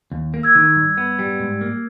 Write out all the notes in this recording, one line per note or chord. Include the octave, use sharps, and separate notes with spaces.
D#2
A#3
E6 G#6
D#3
G2
B3
G3
G#2
A#3